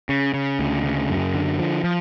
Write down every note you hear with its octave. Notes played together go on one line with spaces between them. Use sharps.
C#3
C#3
D2
C#3
F#2
D3
F3
F3